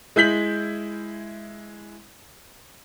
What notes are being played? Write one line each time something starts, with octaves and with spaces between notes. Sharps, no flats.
G#3 E4 G6 B6 F#7